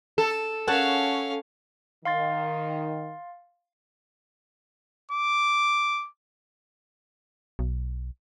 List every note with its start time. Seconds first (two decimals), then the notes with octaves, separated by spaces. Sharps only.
0.18 A4
0.68 C#4 C#5 F5 F#5 A5
2.05 D#3 F5 C6 A6
5.11 D6
7.59 B1